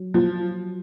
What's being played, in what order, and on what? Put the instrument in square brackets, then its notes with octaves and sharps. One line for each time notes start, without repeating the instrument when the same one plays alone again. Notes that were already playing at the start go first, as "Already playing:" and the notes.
Already playing: [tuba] F#3
[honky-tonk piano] F3